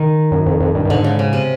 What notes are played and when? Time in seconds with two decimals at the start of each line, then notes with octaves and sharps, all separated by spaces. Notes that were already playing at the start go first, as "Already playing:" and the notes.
Already playing: D#3
0.32 F#2
0.46 F2
0.60 F2
0.75 G2
0.85 G2
0.89 G#2 D3
1.04 C#3
1.19 C#3
1.33 C3